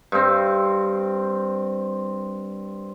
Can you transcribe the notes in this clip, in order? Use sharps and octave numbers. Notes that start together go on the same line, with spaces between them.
G2 C4